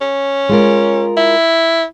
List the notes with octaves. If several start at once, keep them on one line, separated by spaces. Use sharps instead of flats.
C#4
G#3 F4 A#4
E4